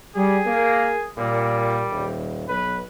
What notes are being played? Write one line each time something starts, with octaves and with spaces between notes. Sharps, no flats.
G3 G#4
A#3
A#2 G3
D#1
B1 B4